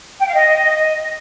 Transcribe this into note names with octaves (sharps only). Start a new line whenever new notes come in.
G5
F5
D#5